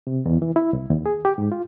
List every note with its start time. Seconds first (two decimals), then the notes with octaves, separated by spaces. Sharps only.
0.07 C3
0.26 E2
0.42 E3
0.56 E4
0.73 C2
0.90 D#2
1.06 G#4
1.25 G4
1.38 G#2
1.52 F4